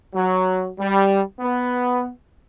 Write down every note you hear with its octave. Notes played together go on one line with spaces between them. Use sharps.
F#3
G3
B3